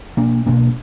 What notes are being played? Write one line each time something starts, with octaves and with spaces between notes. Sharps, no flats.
B2 A#3 D4
B2 A#3 D4